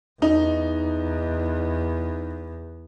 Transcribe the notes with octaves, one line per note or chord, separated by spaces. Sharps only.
E2 D#4